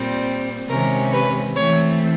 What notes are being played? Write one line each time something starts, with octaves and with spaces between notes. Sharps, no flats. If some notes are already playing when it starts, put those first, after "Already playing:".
Already playing: A#2 G3 C4
C3 D#3 G#3 C#4 A#4
B4
E3 A3 C4 C#5